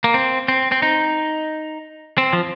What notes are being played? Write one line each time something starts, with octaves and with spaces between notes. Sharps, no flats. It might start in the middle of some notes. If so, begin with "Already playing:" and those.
A#3
C4
C4
C4
D#4
C4
F3